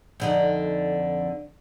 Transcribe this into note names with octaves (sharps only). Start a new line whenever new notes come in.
F2 D3 D#4